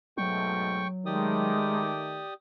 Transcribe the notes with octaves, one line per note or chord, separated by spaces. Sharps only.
G#2 B2 F#3 A3 G5 C#6
D#3 G#3 A3 G4 D5 D#6